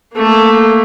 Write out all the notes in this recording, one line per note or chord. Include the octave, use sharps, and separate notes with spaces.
A3 A#3